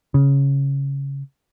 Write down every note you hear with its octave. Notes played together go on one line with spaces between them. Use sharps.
C#3